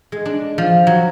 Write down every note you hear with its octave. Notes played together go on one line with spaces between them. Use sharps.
G#3
D4
F3
F#3